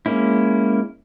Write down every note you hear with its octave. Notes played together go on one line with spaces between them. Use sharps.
G#3 A#3 C#4 E4